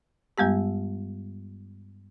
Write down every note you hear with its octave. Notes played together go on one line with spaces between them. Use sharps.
G2 G3 G#3 B3 G4